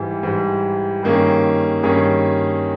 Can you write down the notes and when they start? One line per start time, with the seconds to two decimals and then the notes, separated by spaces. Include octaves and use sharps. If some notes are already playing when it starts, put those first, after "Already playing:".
Already playing: G#2 E3 G3
0.23 G#2 E3 G3
1.03 G2 D#3 A#3 C#4 G#4
1.83 G2 D#3 A#3 C#4 G#4